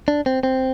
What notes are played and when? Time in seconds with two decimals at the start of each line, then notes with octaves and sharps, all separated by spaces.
0.08 D4
0.26 C4
0.43 C4